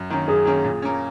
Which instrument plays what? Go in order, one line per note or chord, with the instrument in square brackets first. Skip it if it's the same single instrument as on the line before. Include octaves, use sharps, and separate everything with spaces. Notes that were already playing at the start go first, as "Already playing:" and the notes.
Already playing: [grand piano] F#2
D#3 A#3 C#4
[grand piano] F#2 [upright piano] G#4
[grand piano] D#3 A#3 C#4
A#2
A#3 C#4